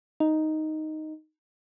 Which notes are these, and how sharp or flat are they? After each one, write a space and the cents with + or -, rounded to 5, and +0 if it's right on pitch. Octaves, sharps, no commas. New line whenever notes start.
D#4 +0